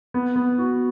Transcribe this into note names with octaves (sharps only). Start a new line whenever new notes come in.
B3
B3
F#4